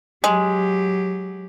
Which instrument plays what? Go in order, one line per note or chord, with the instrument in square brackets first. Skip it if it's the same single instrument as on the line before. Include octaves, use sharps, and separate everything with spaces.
[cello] F#3 G4 [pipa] G#3